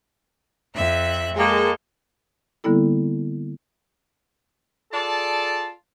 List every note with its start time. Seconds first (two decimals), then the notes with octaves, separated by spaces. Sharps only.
0.75 F2 E5 F#6
1.36 G#3 A#3 A4 G5
2.64 D3 G3 A#3 B3 E4 A4
4.92 F4 G#4 A4 D5 A5